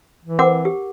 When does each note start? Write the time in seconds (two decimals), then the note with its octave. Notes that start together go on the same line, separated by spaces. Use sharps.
0.25 E3
0.39 C4 A#4 F#5 D6
0.65 G4